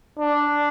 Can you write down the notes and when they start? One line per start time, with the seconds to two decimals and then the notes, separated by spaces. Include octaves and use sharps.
0.19 D4